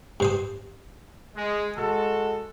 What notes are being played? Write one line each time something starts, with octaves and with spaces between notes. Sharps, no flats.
G2 C5 D#6
G#3
G#3 F#4 A4